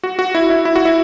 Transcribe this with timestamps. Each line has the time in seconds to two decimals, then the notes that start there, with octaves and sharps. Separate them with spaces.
0.04 F#4
0.19 F#4
0.35 E4
0.50 E4
0.65 E4
0.76 F#4
0.85 E4